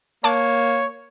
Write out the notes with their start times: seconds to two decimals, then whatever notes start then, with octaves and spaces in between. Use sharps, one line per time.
0.24 A#3 C#5 A5 D6 F#6